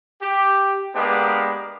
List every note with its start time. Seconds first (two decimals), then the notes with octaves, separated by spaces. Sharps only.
0.22 G4
0.95 G#3 A#3 B3 D4 G4